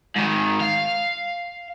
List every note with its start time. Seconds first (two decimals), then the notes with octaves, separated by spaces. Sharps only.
0.16 G#2 D#3
0.60 F5